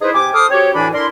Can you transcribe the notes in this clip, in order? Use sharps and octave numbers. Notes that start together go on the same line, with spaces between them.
D#4 E4 G#4 B4 C5
C3 G5 G#5 D6
A4 C5 C6 D6 D#6 F6
C4 F#4 G4 C#5
D2 A2 E3 D4 G#5 B5
D4 E4 A#4 C6